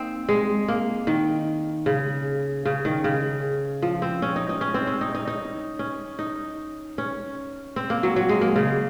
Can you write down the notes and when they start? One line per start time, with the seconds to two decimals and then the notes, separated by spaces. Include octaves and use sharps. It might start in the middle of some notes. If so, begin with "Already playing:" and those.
Already playing: A#3 C4 D#4
0.29 G#3
0.68 A#3
1.07 D#3
1.86 C#3
2.65 C#3
2.85 D#3
3.04 C#3
3.82 F3
4.02 C4
4.22 C#4
4.36 D#4
4.49 D#4
4.61 C#4
4.74 C4
4.87 C#4
5.01 D#4
5.15 D#4
5.28 D#4
5.79 C#4
6.19 D#4
6.98 C#4
7.76 C4
7.90 A#3
8.03 F#3
8.16 F#3
8.29 G#3
8.41 A#3
8.56 C#3